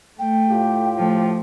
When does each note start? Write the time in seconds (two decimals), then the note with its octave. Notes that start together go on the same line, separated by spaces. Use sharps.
0.19 A3 G5
0.49 A2 F4 G4
0.98 F3 A3